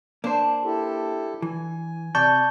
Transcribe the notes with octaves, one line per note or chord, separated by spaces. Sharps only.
A#3 D4 C5
E4 G4 A4
E3 G#5
C3 D5 A5 C#6 G6